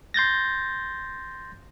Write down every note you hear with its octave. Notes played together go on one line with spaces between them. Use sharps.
C6 G6 A6 A#6